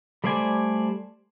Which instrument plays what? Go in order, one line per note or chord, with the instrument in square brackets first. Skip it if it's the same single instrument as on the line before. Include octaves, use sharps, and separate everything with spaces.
[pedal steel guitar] G3 A3 C5 D5 G#5